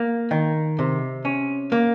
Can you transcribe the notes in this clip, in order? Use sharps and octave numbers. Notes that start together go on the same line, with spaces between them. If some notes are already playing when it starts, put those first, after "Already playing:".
Already playing: A#3
D#3
C3
C#4
A#3